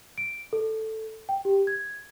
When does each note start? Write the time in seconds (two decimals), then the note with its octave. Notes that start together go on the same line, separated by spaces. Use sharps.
0.18 D7
0.53 A4
1.29 G5
1.45 G4
1.67 G#6